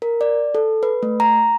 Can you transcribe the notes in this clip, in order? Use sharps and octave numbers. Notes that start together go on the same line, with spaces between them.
A#4
D5
A4
B4
A3
A#5